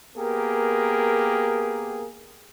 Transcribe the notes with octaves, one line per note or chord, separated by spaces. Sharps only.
A#3 B3 G4 G#4 A#4